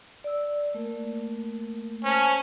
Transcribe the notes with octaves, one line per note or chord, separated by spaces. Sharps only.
D5 E6
A3 A#3 A#4
C#4 C5 A5